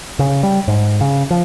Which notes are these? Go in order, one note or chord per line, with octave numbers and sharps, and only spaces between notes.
C#3
G3
G#2
C#3
F3